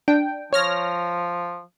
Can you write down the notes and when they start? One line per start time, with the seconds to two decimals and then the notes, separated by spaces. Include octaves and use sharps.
0.08 D4 G5
0.53 F3 C#5 F6 A#6